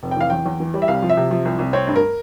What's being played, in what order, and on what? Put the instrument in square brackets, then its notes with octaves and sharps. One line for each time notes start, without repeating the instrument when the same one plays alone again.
[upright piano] F1
G5
E3 F5
E2 G5
E2
E3
G3
E5
C2 F5
F3
E5
C3
F3
C2
C2
C4 C#5
G2
A#4